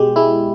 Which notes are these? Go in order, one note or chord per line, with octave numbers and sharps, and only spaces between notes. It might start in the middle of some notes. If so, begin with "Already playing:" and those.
Already playing: B2 G#3 G4
G#3 E4